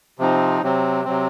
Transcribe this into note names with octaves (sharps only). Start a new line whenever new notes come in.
C3 F3 C4 D#4
C3 F#3 C4
C3 F#3 C4